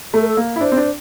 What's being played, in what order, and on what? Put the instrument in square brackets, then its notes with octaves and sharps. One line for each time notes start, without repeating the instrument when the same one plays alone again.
[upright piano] A3 [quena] A4
[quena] A#4
A4
[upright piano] A#3
E4
[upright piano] D4 [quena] C5
[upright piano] C4
D4